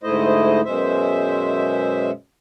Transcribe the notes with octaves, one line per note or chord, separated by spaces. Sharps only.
D2 G#2 A3 E4 C5 D#5
F#2 B2 G#3 C5 E5